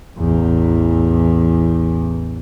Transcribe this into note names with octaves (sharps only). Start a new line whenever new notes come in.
A1 E2